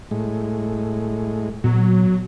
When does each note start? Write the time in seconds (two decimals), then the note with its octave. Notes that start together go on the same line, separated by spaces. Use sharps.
0.11 A2 G#3
1.64 A#2 F#3 B3